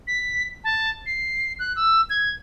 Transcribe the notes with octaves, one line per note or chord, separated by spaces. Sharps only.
B6
A5
C7
F#6
E6
G#6